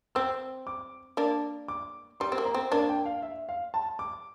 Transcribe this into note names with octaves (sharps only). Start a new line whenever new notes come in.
C4 E6
D6
A#3 D4
D6
G3 C6
C4
A#3
A#5
C4
A#3 D4 A5
G5
F5
E5
F5
A5
D6